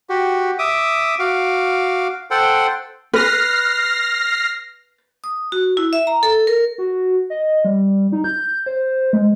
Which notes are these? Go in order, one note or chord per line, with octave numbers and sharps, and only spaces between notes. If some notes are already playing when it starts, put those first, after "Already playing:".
F#4 G4
E5 D6 D#6
F#4 F5 D6
A4 C5 F#5 G5
B4 F6 A#6 C7
D#6
F#4
E4
E5
A#5
A4
A#4
F#4
D#5
G3
D#4
G6
C5
G#3